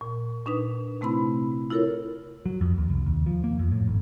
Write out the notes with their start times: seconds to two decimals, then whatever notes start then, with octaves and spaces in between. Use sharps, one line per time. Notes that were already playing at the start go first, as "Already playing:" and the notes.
0.01 A#2
0.45 A#2 D4 D#4 B4
1.01 C3 A3 C4 E4 B5
1.70 E4 F4 A4 A#4 C#5
2.46 F#3
2.61 F2
2.78 D#2
2.90 C2
3.06 D#2
3.26 F3
3.44 A#3
3.59 F2
3.72 A2
3.87 G#1